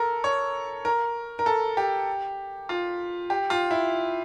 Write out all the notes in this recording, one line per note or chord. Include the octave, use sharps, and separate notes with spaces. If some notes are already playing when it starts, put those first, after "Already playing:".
Already playing: A4 A#4
C#5
A#4
A#4
A4
G4
F4
G4
F4
E4